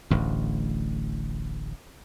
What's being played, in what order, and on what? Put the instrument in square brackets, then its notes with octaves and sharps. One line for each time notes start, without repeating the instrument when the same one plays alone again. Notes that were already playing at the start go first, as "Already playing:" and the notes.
[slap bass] D1 A1 D2